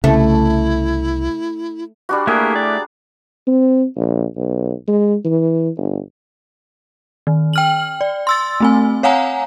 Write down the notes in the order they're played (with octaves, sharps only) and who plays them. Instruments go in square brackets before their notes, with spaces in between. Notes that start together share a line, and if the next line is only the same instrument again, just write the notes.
[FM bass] C2 [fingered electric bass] C#3 [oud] A3 [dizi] E4
[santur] G3 D4 F#4 [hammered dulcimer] C6
[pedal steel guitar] A3 E4 G4 [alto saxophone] A#3 [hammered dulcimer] G#4 A#5
[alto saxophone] D5
[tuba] C4
A#1
B1
G#3
E3
G1
[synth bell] D#3
G5 F6 F#7
D5
C6 E6 A6
A3 C4 G#5
C#5 F5 F#5 G#5 A#5